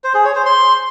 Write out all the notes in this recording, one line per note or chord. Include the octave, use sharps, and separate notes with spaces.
C5
G#4
C#5
C5
C6